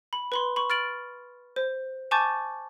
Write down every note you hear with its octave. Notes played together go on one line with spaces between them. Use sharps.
B5
B4 B5 C6
B5 C#6
F6 A6 D7 F#7
C5
G#5 A5 C#6 D6 G6 A6